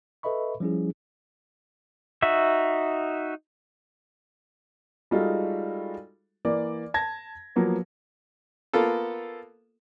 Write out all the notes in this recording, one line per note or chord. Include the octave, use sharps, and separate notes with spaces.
A4 B4 D#5 E5 B5 C#6
F3 G3 C#4 E4 G#4
D#4 F#4 E5
G3 G#3 D#4 F4 F#4 A4
E3 A#3 D5
A5 G#6 A#6
F3 F#3 A#3 B3
A#3 B3 F4 A4